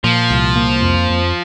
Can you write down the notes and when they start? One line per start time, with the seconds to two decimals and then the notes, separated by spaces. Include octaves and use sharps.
0.04 A#2 F3
0.30 C2
0.56 A#3
0.82 F2
1.10 F2